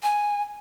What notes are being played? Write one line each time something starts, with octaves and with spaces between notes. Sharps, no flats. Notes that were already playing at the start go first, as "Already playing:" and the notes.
G#5